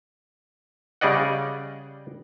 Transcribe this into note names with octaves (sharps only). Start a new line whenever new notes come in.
C#3 G3 G#4 D5 D#5 F#5